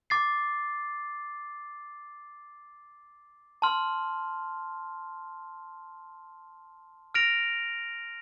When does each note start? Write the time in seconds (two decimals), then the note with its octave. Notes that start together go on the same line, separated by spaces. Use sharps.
0.10 D6 A6 C7
3.62 A5 C6 F6
7.14 F6 A#6 D7 F7